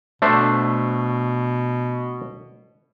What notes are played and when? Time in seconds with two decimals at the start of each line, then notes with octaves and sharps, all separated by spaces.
0.22 B2 A3 D4 C5